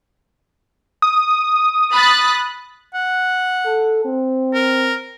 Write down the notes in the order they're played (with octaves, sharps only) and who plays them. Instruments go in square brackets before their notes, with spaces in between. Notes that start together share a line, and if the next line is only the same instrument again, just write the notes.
[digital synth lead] D#6
[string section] B5 F#6 A6
[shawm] F#5
[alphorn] A4
C4
[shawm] A#4